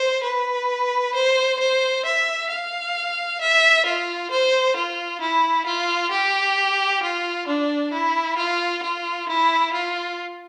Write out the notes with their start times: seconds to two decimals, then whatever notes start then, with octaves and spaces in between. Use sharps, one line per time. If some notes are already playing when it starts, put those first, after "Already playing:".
Already playing: C5
0.24 B4
1.14 C5
1.59 C5
2.05 E5
2.50 F5
3.41 E5
3.86 F4
4.31 C5
4.76 F4
5.21 E4
5.66 F4
6.11 G4
7.03 F4
7.47 D4
7.93 E4
8.37 F4
8.83 F4
9.29 E4
9.73 F4